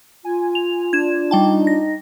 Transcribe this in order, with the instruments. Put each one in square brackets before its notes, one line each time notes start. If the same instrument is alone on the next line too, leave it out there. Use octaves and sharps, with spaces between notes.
[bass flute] F4 [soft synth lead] G#5
[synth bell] F7
[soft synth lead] D4 [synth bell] G#6 E7
[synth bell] G3 G5 A5 [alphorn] D#4
[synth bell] A#6